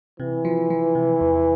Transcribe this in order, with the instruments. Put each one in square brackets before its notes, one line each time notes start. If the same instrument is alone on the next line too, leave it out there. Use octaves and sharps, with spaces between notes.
[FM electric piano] C3 [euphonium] E3
[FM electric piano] F3
F3
C3
E2